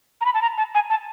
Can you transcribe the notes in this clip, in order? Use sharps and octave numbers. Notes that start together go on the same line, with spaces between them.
A#5
B5
A5
A#5
A5
G#5
A5